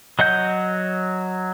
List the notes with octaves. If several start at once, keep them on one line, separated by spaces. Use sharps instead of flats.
F#3 D#5 F#5 G6